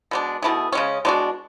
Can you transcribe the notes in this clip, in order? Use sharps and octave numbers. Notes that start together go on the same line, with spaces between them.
B2 G#3 D4
B2 A3 E4 G#4
C#3 G#3 C#4
B2 G#3 D4 F#4